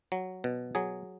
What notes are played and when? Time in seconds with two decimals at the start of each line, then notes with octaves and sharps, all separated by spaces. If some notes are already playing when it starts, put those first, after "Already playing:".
0.12 F#3
0.44 B2
0.75 F#3 G#4